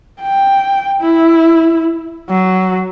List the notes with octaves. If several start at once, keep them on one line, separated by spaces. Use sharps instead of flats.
G5
E4
F#3